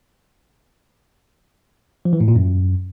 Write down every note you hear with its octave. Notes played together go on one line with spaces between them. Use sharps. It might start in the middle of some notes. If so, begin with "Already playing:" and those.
F3
E3
A2
A#2
F#2